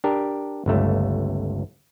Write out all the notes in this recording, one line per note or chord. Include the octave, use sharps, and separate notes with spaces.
D4 G4 A#4
G1 C#2 A3 A4